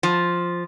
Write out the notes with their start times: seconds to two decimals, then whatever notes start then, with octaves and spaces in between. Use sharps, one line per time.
0.03 F3